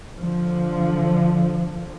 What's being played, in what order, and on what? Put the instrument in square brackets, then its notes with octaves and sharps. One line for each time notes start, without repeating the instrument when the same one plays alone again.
[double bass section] D3 F3